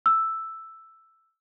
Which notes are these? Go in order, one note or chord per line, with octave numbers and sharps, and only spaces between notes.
E6